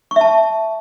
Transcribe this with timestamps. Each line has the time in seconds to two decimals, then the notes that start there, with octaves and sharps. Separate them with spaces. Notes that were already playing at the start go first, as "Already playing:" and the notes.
0.11 C#6
0.16 E5
0.21 A5